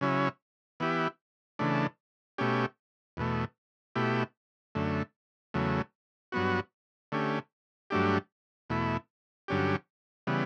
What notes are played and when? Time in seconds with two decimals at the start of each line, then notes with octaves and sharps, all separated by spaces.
0.01 C#3 F#3 C#4 E4
0.80 E3 B3 E4 G4
1.59 C#3 E3 A3 D4
2.38 B2 A3 C#4 G4
3.17 E2 B2 A3
3.96 B2 A3 E4 G4
4.75 F#2 D3 A3
5.54 E2 C#3 F#3 A3
6.32 G2 F#3 B3 F#4
7.12 D3 A3 C#4 G4
7.90 G2 F#3 A3 D4 G4
8.70 E2 B2 A3 E4
9.48 G2 D3 F#3 C#4 G4
10.27 C#3 E3 G3 B3